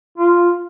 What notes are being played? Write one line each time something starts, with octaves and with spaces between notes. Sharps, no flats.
F4